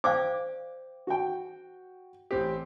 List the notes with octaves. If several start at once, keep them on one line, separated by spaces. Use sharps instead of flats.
C5 D5 F5 G5 D6
F#4 G5
A1 C4 G4